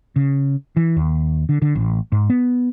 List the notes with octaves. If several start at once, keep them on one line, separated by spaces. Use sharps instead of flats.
C#3
E3
D#2
D3
D3
A1
G#2
B3